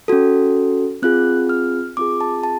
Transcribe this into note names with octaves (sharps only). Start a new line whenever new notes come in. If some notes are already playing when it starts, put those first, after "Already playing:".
C#4 F#4 A4
C4 F4 G#4 F#6
F6
C4 F4 G#4 D6
A5
A5